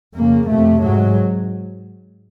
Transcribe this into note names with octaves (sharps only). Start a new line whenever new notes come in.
F2 C#3 A#3
F2 C3 A3
G#2 F#3